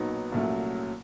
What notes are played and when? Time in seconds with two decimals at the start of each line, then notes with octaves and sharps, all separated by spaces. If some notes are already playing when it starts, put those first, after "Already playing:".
Already playing: B1 A#2 F#3 B3 D#4
0.32 C2 A#2 F#3 A3 C#4